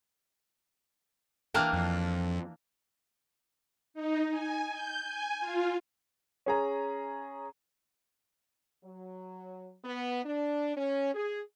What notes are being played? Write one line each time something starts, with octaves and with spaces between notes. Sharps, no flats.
E3 A#3 D4 G5 F6
F2
D#4
G#5
G6
G#5
F4
C#4 G#4 A#5
F#3
B3
D4
C#4
G#4